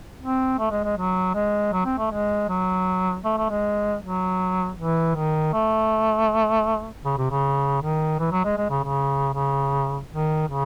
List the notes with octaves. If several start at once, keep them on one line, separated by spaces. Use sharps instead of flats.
C4
A3
G#3
G#3
F#3
G#3
F#3
C4
A3
G#3
F#3
A3
A3
G#3
F#3
E3
D#3
A3
C#3
C3
C#3
D#3
E3
F#3
G#3
G#3
C#3
C#3
C#3
D#3
C#3